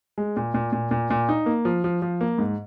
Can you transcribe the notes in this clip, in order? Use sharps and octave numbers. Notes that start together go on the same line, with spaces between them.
G#3
A#2
A#2
A#2
A#2
A#2
D#4
A#3
F3
F3
F3
A#3
G#2